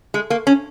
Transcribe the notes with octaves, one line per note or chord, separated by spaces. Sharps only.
G#3
A#3
C#4